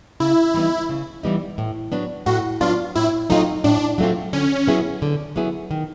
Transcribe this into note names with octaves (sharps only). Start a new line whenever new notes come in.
C#3 E4
E3 G3 B3 D#4
C#3
E3 G3 B3 D#4
A2
F#3 B3 D4
A2 F#4
F#3 B3 D4 F4
A2 E4
F#3 A3 C4 D#4 F4
A2 D4
F#3 A3 C4 F4
D3 C#4
F#3 B3 E4 G#4
D3
F#3 B3 E4 G#4
D#3